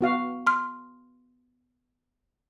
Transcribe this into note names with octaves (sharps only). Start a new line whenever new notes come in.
B3 F#4 F5
C6 F6